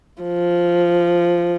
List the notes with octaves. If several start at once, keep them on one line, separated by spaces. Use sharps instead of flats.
F3